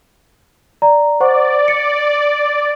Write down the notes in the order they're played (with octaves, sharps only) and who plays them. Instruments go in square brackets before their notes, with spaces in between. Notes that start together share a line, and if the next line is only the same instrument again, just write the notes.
[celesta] D5 A#5
[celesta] C5 F#5 C#6 [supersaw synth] D5
[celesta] C#7